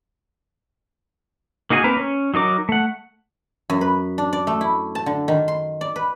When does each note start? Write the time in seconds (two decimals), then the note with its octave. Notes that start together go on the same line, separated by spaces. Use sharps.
1.70 A#3 D#4 F#4 G#4 G#5
1.84 A#3 C4 A#4 B4
1.97 C#4
2.34 F#3 D#4 A#4 D6
2.69 A3 F#5
3.70 F#2
3.81 B4
4.18 D4
4.33 D5
4.47 A3
4.61 E4
4.95 A5
5.06 D3
5.28 D#3
5.48 C6
5.81 D5
5.96 B4